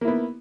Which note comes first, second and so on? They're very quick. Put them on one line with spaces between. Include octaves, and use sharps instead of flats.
A#3 E4 B3